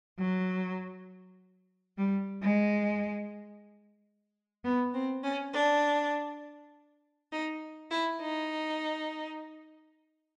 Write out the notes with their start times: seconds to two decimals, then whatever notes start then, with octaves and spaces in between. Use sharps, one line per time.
0.18 F#3
1.97 G3
2.41 G#3
4.64 B3
4.94 C4
5.23 C#4
5.53 D4
7.32 D#4
7.91 E4
8.21 D#4